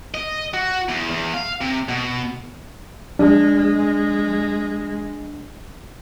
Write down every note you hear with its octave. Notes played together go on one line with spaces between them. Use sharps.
D#5
F#4
E2
E2
F5
C3
B2
G#3 D4